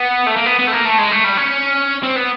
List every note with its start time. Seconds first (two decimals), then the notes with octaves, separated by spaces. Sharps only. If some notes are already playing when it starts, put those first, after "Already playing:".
Already playing: B3
0.26 A3
0.36 A#3
0.46 B3
0.59 B3
0.67 A3
0.72 A#3
0.85 A3
0.98 G#3
1.11 A3
1.24 G3
1.37 C#4
2.03 C4
2.16 B3